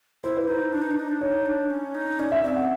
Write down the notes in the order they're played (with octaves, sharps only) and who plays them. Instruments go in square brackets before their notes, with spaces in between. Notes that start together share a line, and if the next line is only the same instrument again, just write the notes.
[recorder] E4 [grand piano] C5
[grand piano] B4
[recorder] D#4 [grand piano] C5
[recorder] D4
D#4
D4
D#4
D4
[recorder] D#4 [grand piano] C#5
[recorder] D4
C#4
D#4
[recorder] C#4 [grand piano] D5
[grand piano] E5
[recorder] C4 [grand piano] D5
[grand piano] F#5